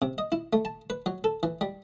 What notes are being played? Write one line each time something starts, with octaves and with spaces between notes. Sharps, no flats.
C3
D#5
E4
A3
A5
B4
F#3
A4
E3
G3